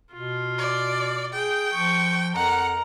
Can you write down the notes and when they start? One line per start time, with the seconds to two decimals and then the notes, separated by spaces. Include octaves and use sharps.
0.13 B2 F4
0.58 D5
1.33 G#4 G5
1.73 F3 C#6
2.36 F2 A#4 F#5 A#5